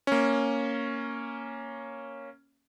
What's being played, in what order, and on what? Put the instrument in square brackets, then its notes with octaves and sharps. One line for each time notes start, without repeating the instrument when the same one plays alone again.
[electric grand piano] A#3 C#4